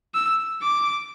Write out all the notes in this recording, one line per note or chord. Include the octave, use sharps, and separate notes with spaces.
E6
D6